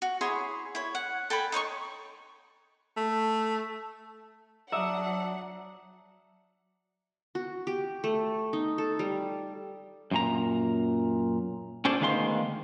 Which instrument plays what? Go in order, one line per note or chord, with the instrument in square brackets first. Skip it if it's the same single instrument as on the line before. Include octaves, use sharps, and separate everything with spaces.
[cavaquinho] F#4
E4 G#4 C#5 C6
E4 C#5
F#5
A4 G5 G#5 B5
D#4 C#5 C6 C#6
[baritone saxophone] A3
[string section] F#3 F#5 [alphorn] D4 [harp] E5 [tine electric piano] A#5 D6 D#6
[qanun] F#4
G4
A3
D#4
A4
G3
[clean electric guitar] F#2 A#2 A#5
C#4 F4 G#4 A4 C5 D5
D2 D#3 G#3 B3 F5 C6